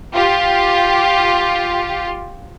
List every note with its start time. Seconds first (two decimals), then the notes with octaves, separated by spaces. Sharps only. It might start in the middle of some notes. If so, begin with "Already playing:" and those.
0.11 F4 G4